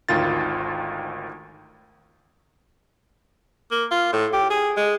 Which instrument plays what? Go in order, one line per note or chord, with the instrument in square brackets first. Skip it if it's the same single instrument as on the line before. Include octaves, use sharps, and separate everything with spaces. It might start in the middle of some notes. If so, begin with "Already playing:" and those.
[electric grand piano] G#1 D2 D#3 F4 A6
[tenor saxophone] A#3
F4
A2
G4
G#4
G#3